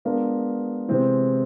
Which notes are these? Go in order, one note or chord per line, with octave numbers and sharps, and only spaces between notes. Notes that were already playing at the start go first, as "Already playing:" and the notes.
G#3 B3 D4 F4 A#4
C3 E3 G#3 C4 E4